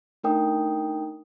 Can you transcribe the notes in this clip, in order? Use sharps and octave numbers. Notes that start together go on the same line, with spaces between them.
A3 D4 D#4 A#4 G5 D#6